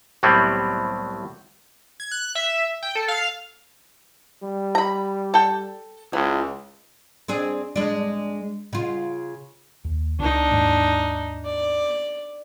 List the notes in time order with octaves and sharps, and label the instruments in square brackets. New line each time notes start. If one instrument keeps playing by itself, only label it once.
[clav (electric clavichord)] C2 A2 F#3 G3 B3 C4
[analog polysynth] G#6
F#6
E5
G5
A4
F5
[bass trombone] G3
[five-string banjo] A#5 B5
A4 G5
[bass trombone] C#2 [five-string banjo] E3
[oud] C4 D4 G#4
G#3 D4
C#3 F4
[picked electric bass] D#2
[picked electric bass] C#2 C#3 [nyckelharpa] D4 D#4
[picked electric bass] D#2 G#2 G#3
[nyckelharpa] D5